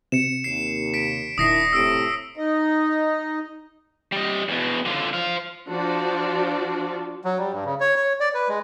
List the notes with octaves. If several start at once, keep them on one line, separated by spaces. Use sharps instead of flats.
C3 C#7 E7
D#2 C7
B6 D7
D#1 D#3 D4 E4 D#6 A#6 C7
A2 C3 E6 D7
D#4 D#5
G3 D#5
E2 B2
D3 F4
C5 F5
F3 D4 F4 F#4
F#3
G3
G2
C#3
C#5
C#5
D5
B4
G#3